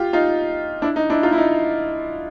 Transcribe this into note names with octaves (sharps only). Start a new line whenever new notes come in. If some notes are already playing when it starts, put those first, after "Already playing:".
Already playing: F4 G4
D#4 F4
D4 E4
D#4
D4 E4
D#4 F4
E4
D#4